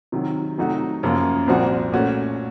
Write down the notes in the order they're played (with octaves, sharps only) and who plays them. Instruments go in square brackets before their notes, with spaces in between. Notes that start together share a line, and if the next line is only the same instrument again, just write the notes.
[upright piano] C3 D#3 F#3
C3 F#3 A3 D#4 F#4
F#2 C#3 F3 A#3
C2 A#2 F3 C4 F#4
A#2 A3 C#4 F#4